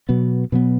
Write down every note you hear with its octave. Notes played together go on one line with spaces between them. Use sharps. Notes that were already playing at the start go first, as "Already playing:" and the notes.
B2 F#3 B3
B2 F#3 B3